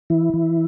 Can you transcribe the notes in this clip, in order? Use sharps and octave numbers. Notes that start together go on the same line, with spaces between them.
E3 E4
E3